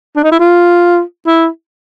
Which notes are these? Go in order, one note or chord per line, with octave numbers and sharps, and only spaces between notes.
D4
D#4
E4
F4
E4